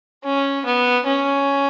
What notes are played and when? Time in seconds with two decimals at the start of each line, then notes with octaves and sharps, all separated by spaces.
0.24 C#4
0.65 B3
1.07 C#4